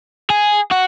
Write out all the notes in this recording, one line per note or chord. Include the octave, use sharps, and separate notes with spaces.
G#4
F#4